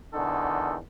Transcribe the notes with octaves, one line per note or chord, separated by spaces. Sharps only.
E2 D3 D#3 A4